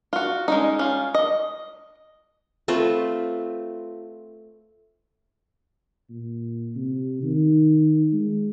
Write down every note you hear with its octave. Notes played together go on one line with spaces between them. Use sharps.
F4 F#4
G#3 C#4 D#4
C#4 F4
D#5
A3 C4 F4 B4
A#2
C3
D#3
G#3